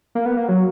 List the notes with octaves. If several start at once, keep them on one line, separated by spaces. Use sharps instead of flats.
A#3
B3
A#3
F#3